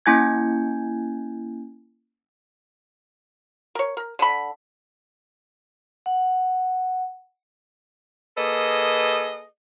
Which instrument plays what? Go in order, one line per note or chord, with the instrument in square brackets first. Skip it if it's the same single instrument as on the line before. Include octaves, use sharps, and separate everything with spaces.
[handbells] A#3 C#4 E4 G#5 G6 G#6
[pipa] A#4 C#5
A#4
D3 B5
[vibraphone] F#5
[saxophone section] A#3 G#4 A4 B4 D#5